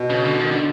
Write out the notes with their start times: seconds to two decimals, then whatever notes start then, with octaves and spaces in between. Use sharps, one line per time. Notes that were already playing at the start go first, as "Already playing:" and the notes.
Already playing: B2
0.10 C#3
0.25 D3
0.40 D#3
0.51 D3